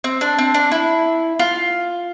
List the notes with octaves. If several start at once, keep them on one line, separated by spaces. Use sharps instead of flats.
C4
D4
C4
D4
E4
F4